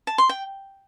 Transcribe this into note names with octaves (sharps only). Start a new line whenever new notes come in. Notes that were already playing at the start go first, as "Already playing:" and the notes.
A5
C6
G5